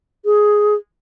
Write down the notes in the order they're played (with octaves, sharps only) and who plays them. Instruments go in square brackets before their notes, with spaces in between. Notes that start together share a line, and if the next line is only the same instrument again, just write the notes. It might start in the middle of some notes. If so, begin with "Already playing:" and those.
[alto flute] G#4